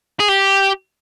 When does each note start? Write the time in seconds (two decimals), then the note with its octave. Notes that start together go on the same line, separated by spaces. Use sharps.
0.20 G#4
0.28 G4